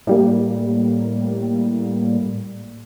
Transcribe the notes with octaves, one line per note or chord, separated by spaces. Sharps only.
A2 G3 A#3